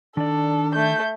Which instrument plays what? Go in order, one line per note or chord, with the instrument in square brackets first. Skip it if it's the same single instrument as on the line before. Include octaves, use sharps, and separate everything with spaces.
[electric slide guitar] D#3 D5 [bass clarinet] D4 [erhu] A4
[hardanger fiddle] A3 [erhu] G6